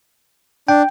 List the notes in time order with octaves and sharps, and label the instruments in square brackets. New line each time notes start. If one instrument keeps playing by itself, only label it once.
[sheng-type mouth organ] D4 [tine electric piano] G5